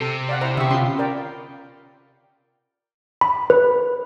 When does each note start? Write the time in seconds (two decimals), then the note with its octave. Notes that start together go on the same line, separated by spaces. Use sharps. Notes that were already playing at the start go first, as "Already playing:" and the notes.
0.01 C3 A4
0.29 D5 F5 F#5
0.41 D4 E4 C5 A#5
0.57 D3 B3 G4 E5 C#6
0.71 C#4 F4 C6
0.98 A#4 D5 G5
3.21 B5
3.50 B4